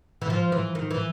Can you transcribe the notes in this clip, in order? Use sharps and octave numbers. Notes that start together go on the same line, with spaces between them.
E3
F3
E3
D#3
E3